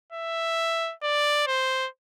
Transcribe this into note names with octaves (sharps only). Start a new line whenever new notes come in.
E5
D5
C5